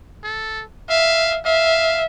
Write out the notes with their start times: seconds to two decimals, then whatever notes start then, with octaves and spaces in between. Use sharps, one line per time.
0.24 A4
0.90 E5 F5
1.45 E5 F5